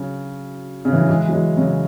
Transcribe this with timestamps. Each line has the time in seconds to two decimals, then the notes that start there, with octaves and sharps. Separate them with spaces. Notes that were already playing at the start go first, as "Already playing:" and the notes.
Already playing: C#3 F#3
0.85 C#3
0.93 E3
1.01 F#3
1.09 E3 G#3
1.28 F#3
1.33 E3 G#3
1.57 C#3 F#3